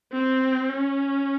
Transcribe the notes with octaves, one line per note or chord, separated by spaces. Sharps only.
C4
C#4